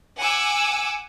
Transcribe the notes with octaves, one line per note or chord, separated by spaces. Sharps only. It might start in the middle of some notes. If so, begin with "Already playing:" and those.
F#5 G#5 D6 E6